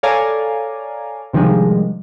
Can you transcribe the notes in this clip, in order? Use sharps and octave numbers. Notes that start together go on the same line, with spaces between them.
A4 C#5 D5 F5 G#5 A#5
C3 D#3 F3 G3 G#3 D4